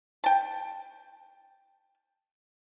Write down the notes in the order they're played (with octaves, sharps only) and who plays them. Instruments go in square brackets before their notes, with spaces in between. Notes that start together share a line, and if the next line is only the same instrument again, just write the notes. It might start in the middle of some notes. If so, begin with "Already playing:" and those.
[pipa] G5 A5